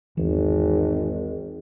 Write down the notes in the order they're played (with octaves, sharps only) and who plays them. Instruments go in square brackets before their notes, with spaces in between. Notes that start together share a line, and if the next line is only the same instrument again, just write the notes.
[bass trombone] G#1 [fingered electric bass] E2 E3